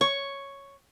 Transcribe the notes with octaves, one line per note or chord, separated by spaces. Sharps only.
C#5 C#6